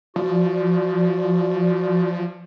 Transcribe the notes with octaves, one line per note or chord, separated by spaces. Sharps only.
F3 F#4 D5